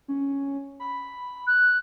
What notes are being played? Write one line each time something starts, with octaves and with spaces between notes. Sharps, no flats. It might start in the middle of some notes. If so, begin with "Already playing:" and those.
C#4
B5
F#6